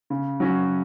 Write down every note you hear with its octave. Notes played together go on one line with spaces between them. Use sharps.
C#3
F#3 C#4 F#4